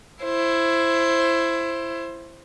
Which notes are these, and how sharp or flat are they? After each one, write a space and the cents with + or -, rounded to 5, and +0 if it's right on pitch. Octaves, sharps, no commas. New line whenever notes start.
E4 +20 C5 +15